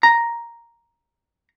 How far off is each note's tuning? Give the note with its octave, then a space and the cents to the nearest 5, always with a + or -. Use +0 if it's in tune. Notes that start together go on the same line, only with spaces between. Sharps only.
A#5 +5